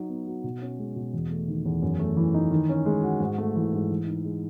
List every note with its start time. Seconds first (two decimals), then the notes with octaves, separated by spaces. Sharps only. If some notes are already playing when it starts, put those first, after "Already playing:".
Already playing: F#3 D#4
0.09 B3
0.27 F#4
0.44 B2
0.62 C#4
0.79 G#3
0.96 B2
1.13 E2
1.30 A3
1.48 D#3
1.66 E2
1.82 F#2
1.99 A3
2.17 E3
2.34 D#4
2.51 D#3
2.69 C#4
2.86 G#3
3.03 F#4
3.20 G#2
3.38 A3
3.56 E3
3.73 G#2
3.90 E3
4.06 D#4
4.24 G#3